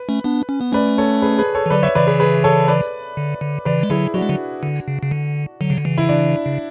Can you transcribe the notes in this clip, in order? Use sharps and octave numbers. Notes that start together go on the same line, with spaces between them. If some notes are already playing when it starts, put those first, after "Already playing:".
Already playing: B4
A3 C#4
B3 D4
C#4
B3
A3 C#4 B4 D5
A4 C#5
G#4 B4
G#4 B4
A4 C#5
E3
D3 F#3 B4 D5
C#5 E5
C#3 E3 B4 D5
G#4 B4
G#4 B4
A4 C#5
B4 D5
D3
D3
C#3 E3 B4 D5
G#3
D3 F#3 E4 G#4
F#3 D4 F#4
G#3
D3 F#3
D3
C#3
C#3
D3
D3 F#3
C#3
D3
C#3 E3
E4
D4
C#3